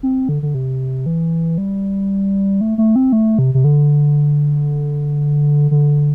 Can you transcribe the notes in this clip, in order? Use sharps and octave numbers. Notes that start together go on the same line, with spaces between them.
C4
D3
D3
C3
E3
G3
A3
A3
C4
A3
C3
C3
D3
D3